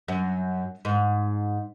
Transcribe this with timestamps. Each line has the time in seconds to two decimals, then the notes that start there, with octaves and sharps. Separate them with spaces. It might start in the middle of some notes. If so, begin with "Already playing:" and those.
0.08 F#2
0.85 G#2